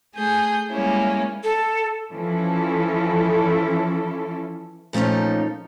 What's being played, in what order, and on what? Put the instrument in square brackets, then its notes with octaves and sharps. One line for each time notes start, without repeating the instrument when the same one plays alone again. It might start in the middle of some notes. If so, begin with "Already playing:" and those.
[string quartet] A3 G#4 G6
G3 G#3 A#3 C#4 E4
[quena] A4
[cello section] E3 F3 C#4 E4 A4
[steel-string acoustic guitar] A#2 F3 A3 C#4 D#4